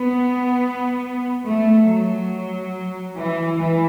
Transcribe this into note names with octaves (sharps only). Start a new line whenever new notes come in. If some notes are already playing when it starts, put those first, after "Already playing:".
Already playing: B3
A3
F#3
E3
E3